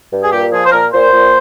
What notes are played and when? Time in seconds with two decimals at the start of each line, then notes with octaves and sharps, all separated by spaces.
0.12 G2
0.23 G#4
0.31 A#2 G4
0.52 F3 G#4
0.65 C5
0.72 A#2 A#4
0.92 A#2 C5
1.13 A#2